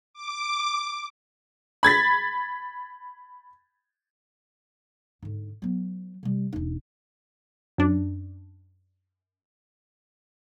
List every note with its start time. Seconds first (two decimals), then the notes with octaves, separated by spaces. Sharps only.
0.14 D6
1.83 B5 G#6 A6 B6
5.23 G#2 D3
5.62 F#3 B3
6.23 C3 G3
6.53 E1 D#4
7.78 F#2 D4